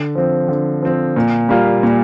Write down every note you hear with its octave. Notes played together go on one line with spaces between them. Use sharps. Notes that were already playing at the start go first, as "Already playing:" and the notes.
Already playing: D3
F3 C4
D3
F3 C4
A#2
G3 A#3 F4
A#2